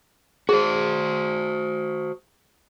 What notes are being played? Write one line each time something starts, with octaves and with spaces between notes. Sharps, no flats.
F#4 G#4 C5